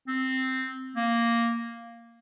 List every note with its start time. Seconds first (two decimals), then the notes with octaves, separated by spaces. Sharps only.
0.08 C4
0.96 A#3